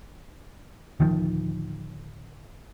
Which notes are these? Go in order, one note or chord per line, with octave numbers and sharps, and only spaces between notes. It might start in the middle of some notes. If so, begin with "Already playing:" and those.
D1 D#3 F3